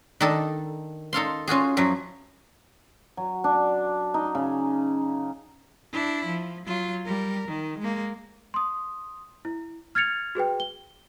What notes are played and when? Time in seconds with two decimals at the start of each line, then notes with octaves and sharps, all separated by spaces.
0.20 D#3 D4 D#4 A4
1.13 D#4 A4 F5 C6
1.47 C#4 F4 F#4 G#4
1.77 F#2 F3 F#3 E4
3.17 F#3
3.44 D4
4.14 D#4
4.35 C#3
5.92 D4 E4
6.26 F3
6.66 F#3 F4
7.06 G3 A#4
7.48 D#3
7.79 G#3 A#3
8.54 C6 D#6
9.45 E4
9.95 F6 G#6 A6 C#7 F7
10.35 F#4 G#4 B4 G5
10.60 G7